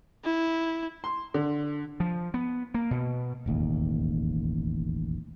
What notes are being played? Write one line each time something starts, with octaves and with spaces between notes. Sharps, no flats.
E4
C6
D3
F3
B3
A#3
B2
E1 A1 D#2